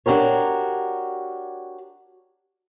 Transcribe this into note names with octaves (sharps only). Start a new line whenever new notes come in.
D4 F#4 G4 A#4 C#5